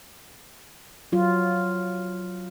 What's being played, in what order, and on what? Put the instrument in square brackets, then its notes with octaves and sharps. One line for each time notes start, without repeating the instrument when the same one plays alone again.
[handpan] F#3 F4